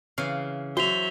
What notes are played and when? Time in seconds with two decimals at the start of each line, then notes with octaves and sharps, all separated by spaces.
0.18 C#3 E3 F5
0.77 F#3 F#4 C5 E5 F7 G7